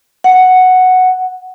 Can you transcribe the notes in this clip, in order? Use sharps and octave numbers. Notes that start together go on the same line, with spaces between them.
F#5